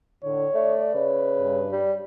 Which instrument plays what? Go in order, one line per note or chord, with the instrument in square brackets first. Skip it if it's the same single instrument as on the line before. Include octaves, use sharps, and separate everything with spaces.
[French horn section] A2 D3 [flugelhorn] C#5
[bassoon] A3 [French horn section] D5
[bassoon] C#3 [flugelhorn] B4
[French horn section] G2
[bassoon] G3